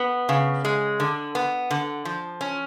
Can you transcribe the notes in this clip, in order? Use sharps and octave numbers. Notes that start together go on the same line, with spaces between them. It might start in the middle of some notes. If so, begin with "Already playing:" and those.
Already playing: B3
C#3
G#3
D3
B3
D3
F3
C#4